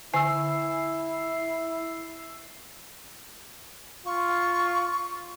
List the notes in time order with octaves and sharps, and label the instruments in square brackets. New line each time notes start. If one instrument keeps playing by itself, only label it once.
[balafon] D3 G#5 [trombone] E4 [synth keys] E6 C7
[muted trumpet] F4 [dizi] C#6